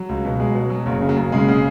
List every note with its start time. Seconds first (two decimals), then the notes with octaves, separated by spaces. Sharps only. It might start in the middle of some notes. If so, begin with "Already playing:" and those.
Already playing: F#3
0.09 C#2
0.25 B2
0.40 F#3 G#3
0.55 B2
0.70 F#3
0.86 F#1 F#3
1.01 C#3
1.09 F#3
1.17 F#1
1.32 C#3 G#3
1.49 C#3